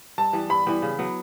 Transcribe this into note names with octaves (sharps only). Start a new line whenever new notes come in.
G2 A5
E3 G3 B3
G2 B5
E3 G3 B3
C#3
F#3 B3